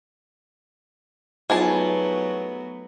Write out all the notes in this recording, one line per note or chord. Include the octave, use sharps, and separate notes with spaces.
F#3 A3 B3 D#4 F4 G#4 G#5 A5